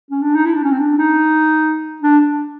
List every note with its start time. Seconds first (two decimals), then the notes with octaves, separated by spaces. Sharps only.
0.11 C#4
0.22 D4
0.34 D#4
0.45 E4
0.54 D4
0.63 C#4
0.72 C4
0.80 D4
0.98 D#4
2.02 D4